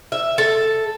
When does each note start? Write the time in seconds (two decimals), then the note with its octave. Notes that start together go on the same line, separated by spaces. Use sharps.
0.12 E5
0.38 A4